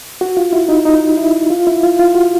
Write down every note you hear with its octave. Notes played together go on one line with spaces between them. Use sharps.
F#4
F4
E4
D#4
D#4
E4
F4
E4
F4
F4
F#4